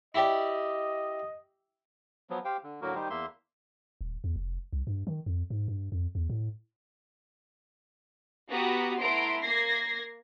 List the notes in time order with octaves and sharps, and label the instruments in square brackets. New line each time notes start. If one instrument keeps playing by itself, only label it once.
[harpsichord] E4 G4 D5 [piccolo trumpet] D#5
[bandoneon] F3 F#3 B3
G4 C5 F5 G5
D3
A2 D3 F#3 A#3 F#4 A#4
D#3 G3 D#4 G4 C5
E2 A#3 E5 C6
[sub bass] D#1
E2
F1
C2
G2
D#3
F2
G#2
G2
F2
E2
A2
[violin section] B3 F#4 G4 F#5 A#5 D#6
A3 B3 E4 A#5 C6 D7
A#3 G#6 A#6 C7